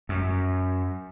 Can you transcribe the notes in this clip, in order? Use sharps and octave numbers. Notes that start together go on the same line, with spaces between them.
F#2